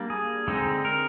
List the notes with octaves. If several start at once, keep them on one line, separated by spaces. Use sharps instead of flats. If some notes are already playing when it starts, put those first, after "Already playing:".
Already playing: G3 A#3 D4
G#4
D3 G#3 C4 D#4
A#4